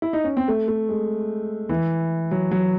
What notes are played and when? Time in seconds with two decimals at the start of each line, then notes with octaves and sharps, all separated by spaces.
0.02 E4
0.13 D#4
0.24 C#4
0.37 C4
0.48 A3
0.68 A3
0.89 G#3
1.69 E3
2.31 F#3
2.52 F#3